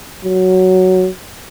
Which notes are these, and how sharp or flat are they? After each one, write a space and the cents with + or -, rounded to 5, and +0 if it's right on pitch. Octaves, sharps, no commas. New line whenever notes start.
F#3 +5